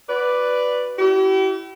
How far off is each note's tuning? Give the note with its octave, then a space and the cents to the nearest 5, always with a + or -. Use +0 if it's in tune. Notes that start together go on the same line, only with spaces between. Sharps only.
F#4 +0 B4 +5 D5 +0
E4 +10 G4 -45